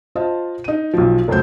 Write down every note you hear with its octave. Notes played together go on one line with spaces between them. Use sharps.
F4 C5 D#5 F5 A5
D#4 D#7
B1 F3
F1 C#2 F#3 C5 G6